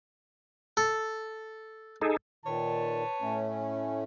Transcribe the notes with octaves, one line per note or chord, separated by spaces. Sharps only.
A4
D#4 G#4 A4
A#2 D#3 B4 C#5 A5
A2 A3 C#4